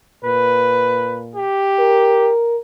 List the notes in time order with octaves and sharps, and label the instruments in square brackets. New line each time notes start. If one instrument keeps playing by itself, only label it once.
[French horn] A#2 [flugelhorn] B4
[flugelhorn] G4
[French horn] A#4